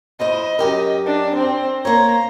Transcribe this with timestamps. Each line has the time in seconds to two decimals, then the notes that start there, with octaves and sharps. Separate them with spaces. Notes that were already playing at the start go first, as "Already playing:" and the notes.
0.20 F2 E4 C5 D#5
0.59 F#2 G4 A#4
1.06 D4
1.36 C4
1.85 A#3 C5 C#5 A#5